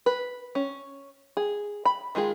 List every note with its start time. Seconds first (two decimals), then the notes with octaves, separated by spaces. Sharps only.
0.06 B4
0.55 C#4
1.37 G#4
1.85 B5
2.15 D#3 G#3 F4 G#4